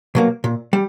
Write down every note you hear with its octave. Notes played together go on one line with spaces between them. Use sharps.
B2 F#3 A#3
A#2
G3